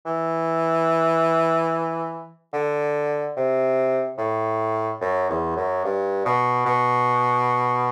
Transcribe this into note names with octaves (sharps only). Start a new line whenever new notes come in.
E3
D3
C3
A2
F#2
E2
F#2
G2
B2
B2